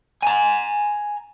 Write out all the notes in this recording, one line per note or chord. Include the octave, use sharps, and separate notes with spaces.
G#5 A#5